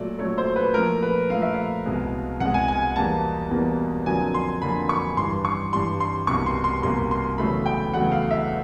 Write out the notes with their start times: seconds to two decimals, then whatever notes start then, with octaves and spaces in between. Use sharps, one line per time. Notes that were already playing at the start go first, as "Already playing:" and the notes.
Already playing: A#2 F#3 A3 D5
0.19 A#2 F#3 A3 C#5
0.38 C5
0.56 B4
0.74 A#2 F3 A3 A#4
1.02 B4
1.30 A#2 F3 A3 F5
1.42 E5
1.54 F5
1.86 C2 B2 G#3
2.40 C2 B2 G#3 F#5
2.54 G#5
2.68 G#5
2.96 E2 B2 G3 A#3 A5
3.51 E2 B2 G3 A#3
4.06 F2 D3 F#3 A#3 G#5
4.34 C6
4.62 F2 D3 F#3 A#3 B5
4.89 C#6
5.17 G2 E3 G3 C6
5.45 C#6
5.72 G2 E3 G3 C6
6.00 C6
6.27 C2 B2 G3 A#3 C#6
6.46 C6
6.64 C6
6.83 C2 B2 G3 A#3 C6
7.11 C6
7.38 E2 C#3 F#3 A3 B5
7.66 G5
7.94 E2 C#3 F#3 A3 F#5
8.12 F5
8.31 E5